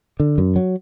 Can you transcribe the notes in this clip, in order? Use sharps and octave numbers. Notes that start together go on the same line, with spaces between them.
D3
F#2
F#3